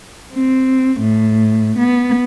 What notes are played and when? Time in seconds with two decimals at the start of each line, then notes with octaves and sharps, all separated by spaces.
0.34 C4
1.00 A2
1.78 B3